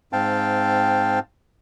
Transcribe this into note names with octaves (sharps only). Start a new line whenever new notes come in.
G#2 C4 F5 G5 A5